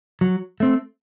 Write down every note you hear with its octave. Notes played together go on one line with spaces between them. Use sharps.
F#3
A3 C4